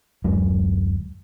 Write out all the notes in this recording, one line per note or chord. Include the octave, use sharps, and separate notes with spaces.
D1 F#2 F#3 G#3